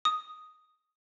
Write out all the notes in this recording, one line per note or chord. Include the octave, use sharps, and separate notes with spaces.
D#6